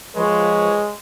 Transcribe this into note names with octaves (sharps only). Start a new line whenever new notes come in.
F3 G#3 B4 C#5